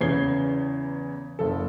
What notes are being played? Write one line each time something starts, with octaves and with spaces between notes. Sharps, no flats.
E2 C#3 C#5 G#6 C7 G7
F#1 A4